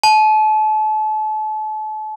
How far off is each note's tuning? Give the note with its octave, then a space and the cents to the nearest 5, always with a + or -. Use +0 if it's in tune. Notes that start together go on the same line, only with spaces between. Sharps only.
A5 -35